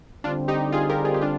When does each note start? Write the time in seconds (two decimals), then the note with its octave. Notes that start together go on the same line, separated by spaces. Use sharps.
0.24 D3 G3 C4 D4 F4
0.48 D#4 G4
0.72 F4 G#4
0.89 G4 A#4
1.05 F4 G#4
1.14 G4
1.21 D4 F4